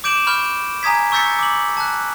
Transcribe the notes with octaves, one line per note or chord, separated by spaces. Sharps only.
D6 G6 D7 E7 F#7
B5 C#6 F6 G6
G#5 A#5 D#6 G#6 B6
C#6 E6 G6 A6 B6 C#7
D6 F#7
A5 F#6